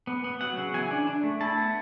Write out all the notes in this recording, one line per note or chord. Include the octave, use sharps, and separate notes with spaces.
B3
B3
F#3 F#5
C#3
E3 G#5
D4
D4
A3
E4 A5
B3